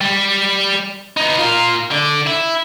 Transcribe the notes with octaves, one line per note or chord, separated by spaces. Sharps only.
G3
B3 D#4
F4 A#4
D3 D5
E4